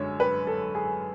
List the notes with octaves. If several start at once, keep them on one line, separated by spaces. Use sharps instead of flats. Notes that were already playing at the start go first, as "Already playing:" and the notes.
Already playing: F#2 D3 G#3 C#5
B4
A4
G#4